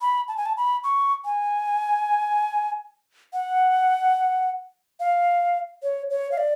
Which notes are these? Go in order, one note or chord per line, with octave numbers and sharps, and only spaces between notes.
B5
A5
G#5
A5
B5
C#6
G#5
F#5
F5
C#5
C#5
F5
D5